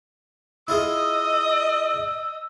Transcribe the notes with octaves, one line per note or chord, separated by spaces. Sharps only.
E4 F4 G#4 D#5 E6